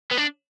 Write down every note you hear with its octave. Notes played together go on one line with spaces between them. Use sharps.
B3
D4